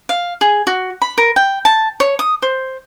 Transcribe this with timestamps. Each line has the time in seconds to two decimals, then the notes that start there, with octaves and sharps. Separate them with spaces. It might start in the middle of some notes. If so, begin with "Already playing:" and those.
0.09 F5
0.41 G#4
0.67 F#4
1.02 B5
1.18 A#4
1.36 G5
1.65 A5
2.00 C#5
2.19 D#6
2.42 C5